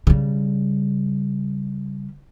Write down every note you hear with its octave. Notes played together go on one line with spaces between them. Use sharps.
C#3 G3